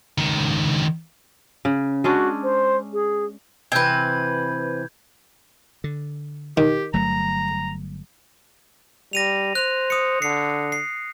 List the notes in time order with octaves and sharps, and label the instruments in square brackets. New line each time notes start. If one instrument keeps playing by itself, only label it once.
[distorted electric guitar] C#2 D#3
[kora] C#3
[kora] G#3 C#4 D4 [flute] F#4
[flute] C5
G#4
[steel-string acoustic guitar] C3 E3 [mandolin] C4 B4 [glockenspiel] G6 G#6
[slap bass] D3
[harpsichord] D#3 [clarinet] G4
[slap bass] G1 F#3 A3 [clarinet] A#5
[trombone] G3 [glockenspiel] A#6 D#7 F7
[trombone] C5 [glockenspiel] F#6 F7
[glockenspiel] D#6 C#7
[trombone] D3 [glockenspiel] C7 C#7
[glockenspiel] C7